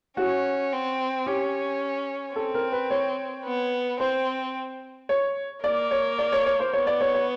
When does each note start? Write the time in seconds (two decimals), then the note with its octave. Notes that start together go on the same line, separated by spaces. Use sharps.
0.17 C#4 F#4
0.72 C4
1.26 C#4 G4
2.36 C4 A4
2.54 A#4
2.72 B4
2.90 C#5
3.45 B3
4.00 C4 C5
5.09 C#5
5.64 A#3 D5
5.91 C#5
6.18 D5
6.32 C#5
6.46 C#5
6.60 C5
6.73 B3 C#5
6.87 D5
7.01 C#5
7.14 C#5